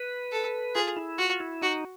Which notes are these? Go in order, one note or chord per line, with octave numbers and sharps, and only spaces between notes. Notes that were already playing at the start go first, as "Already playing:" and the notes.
Already playing: B4
A4
F4 G#4
E4
F4 F#4
E4
D#4 F#4